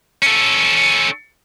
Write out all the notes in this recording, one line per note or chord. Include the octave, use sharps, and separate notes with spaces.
C#4 A4